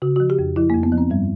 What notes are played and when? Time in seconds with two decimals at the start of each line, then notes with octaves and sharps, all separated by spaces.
0.02 C#3 F#4
0.16 F3 F#4
0.30 G4
0.39 F2
0.56 F3 E4
0.70 A#3
0.74 F2
0.83 B3
0.92 F3
0.98 C4
1.10 G2 G3